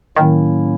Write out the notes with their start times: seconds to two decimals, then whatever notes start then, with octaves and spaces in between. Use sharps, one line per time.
0.16 A2 D#3 F#3 A#3 C#4 E4